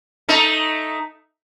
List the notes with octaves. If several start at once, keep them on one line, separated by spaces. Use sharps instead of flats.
A3 D#4